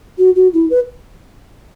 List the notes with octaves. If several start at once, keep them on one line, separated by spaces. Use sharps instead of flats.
F#4
F#4
E4
B4